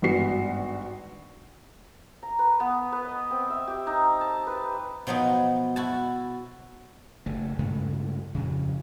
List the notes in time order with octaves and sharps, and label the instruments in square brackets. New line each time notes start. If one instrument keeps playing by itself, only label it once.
[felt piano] G#1 G2 B3 F#4 C7
[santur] A#5
B4
B3
B4
D#5
C4
E5
G4
D#4
A5
B4
[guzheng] B2 F3 F#3 B3 D#4
E4 F#4 A5
[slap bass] F#1 A3
G2 C#3 G#3 A3
F2 C#3